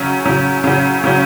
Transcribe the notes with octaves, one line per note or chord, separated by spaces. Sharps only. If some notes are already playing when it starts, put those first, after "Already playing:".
Already playing: C#3 F#3 C#4
C#3 F#3 C#4
C#3 F#3 C#4
C#3 F#3 C#4